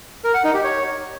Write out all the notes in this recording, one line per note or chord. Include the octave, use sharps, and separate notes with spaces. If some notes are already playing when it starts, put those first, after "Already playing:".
A#4
F#5
D#4
G4
C#5